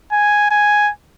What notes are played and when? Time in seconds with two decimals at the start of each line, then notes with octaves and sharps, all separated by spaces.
0.12 G#5
0.51 G#5